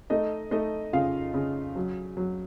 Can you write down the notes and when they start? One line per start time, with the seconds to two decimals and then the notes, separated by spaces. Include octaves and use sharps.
0.10 A3 D#4 D#5
0.51 A3 D#4 D#5
0.93 C#3 F4 F5
1.34 C#3
1.76 F#3
2.17 F#3